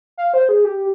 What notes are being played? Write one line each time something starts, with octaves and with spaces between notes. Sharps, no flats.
F5
C5
G#4
G4